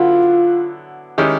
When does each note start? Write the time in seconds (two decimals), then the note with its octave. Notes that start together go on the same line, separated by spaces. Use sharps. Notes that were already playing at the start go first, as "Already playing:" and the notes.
Already playing: D3 F#3 B3 E4 F4
1.18 D#3 G#3 C#4 E4 G4